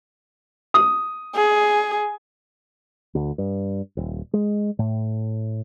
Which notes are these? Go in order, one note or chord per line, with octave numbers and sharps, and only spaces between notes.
D#6
G#4
D2
G2
D#1
G#3
A2